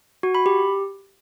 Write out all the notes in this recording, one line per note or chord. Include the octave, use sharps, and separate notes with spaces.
F#4
B5
G4